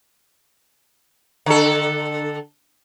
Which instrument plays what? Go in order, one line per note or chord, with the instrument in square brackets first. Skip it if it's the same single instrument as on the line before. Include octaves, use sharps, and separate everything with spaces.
[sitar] D3 A4